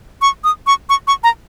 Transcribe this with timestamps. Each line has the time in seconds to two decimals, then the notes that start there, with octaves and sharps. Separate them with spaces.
0.22 C#6
0.44 D#6
0.67 C#6
0.89 C#6
1.07 C#6
1.24 A#5